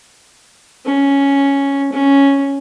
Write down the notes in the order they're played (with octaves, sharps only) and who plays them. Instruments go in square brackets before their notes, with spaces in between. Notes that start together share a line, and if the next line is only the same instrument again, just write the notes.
[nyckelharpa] C#4
C#4